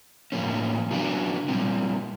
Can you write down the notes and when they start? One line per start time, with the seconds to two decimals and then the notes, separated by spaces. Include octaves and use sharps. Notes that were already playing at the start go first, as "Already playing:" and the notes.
0.32 A2 F3 A#3 C#4
0.91 C#3 F#3 B3 D4
1.48 A#2 G3 C4